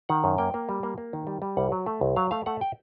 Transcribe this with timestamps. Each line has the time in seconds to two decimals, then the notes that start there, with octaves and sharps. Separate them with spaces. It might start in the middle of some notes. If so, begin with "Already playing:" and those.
0.09 D#3 F#5
0.24 F#2
0.38 A#3 G5
0.54 A#3
0.69 G3
0.83 A#3
0.98 A#3
1.13 D#3
1.27 G3
1.42 G3
1.57 C2 F#5
1.72 F#3
1.86 A3
2.01 C2
2.16 F#3 F5
2.31 A3 F5
2.46 A3 F#5
2.61 G5